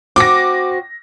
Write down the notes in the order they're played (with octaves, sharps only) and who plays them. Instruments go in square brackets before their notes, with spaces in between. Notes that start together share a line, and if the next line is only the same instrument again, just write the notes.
[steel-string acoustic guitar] C4 F#4 [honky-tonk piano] D6 A#6